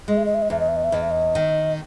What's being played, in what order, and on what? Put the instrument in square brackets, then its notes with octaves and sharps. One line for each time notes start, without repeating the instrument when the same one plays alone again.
[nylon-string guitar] G#3 [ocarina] D#5
[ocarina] E5
D#5
E5
D#5
[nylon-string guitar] E2 [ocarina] E5
[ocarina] D#5
E5
D#5
E5
[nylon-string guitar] E2 [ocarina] D#5
[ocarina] E5
D#5
[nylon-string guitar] D#3